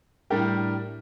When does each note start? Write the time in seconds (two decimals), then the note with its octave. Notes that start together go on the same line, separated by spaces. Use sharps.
0.30 A2 G3 D4 G4 A#4